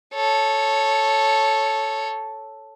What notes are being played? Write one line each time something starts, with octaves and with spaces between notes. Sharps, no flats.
A4 C#5